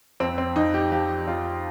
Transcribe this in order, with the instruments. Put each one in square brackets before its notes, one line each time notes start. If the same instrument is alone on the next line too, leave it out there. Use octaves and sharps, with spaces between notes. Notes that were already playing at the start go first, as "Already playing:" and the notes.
[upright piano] F2 C4
C4
F2 D#4
G4
F3 G4
F2 F4